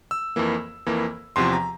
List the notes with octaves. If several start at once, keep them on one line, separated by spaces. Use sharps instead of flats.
E6
F2 E3 A#3
F2 E3 A#3
E2 C3 F3 C6
A#5